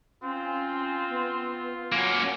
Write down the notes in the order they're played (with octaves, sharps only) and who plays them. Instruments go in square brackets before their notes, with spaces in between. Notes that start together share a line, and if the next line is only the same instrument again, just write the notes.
[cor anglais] C4 [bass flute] C#4 [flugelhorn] F4
[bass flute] B3
[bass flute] F#3 [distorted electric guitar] A#3 C#4